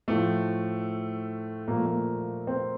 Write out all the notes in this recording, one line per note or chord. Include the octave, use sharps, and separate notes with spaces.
A2 F3 A3
A#2 F3 A#3
A3
A#3
C4